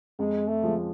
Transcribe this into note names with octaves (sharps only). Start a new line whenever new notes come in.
F2 G#3
A3
F3 G#3